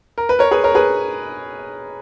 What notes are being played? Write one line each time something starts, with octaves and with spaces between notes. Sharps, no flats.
A#4
B4
A#4 C#5
G#4 B4
A#4 C#5
G#4 B4